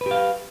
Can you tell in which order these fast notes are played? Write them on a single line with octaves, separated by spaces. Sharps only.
B4 G4 F5